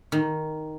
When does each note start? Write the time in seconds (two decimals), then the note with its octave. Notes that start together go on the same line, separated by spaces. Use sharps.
0.12 D#3